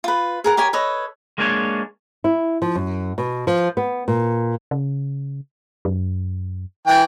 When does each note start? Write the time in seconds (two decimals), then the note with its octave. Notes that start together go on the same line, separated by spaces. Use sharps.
0.04 F4 B4
0.44 G#4 A#4 F#5
0.57 G4 A#4 C#5 G#5
0.73 A4 B4 C#5 D#5
1.38 G#3 A#3 D4 G#4 B4 C#5
2.24 E4
2.62 F3
2.75 F#2
3.18 B2
3.47 F3
3.77 B3
4.08 A#2
4.71 C#3
5.85 F#2
6.87 E3 G5